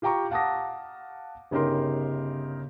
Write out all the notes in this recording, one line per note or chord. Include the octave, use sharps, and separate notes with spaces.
F4 G4 G5 A#5 C#6
F5 F#5 A5 D6 D#6 A#6
G1 C#3 D#4 G4 A#4 C6